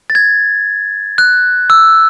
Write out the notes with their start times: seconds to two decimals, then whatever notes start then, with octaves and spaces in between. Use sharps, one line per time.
0.10 A6
0.15 G#6
1.18 F#6
1.70 E6